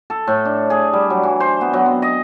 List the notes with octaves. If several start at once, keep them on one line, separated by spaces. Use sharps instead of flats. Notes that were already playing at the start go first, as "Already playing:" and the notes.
A4
A2
D4
G#4
G3
F#3
E3
C5
B3
F#3
C4
D#5